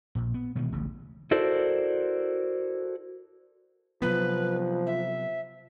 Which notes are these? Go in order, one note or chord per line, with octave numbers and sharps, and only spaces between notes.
A#1 A#2
B3
B2 D#3 E3 G#3
D1 A1 C#3
E4 F#4 A4 A#4 C5 D5
C3 F3 F#3 B3 B4
E5